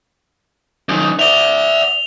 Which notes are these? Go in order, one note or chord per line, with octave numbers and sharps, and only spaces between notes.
F#2 D#3
D5 E5 F7 G7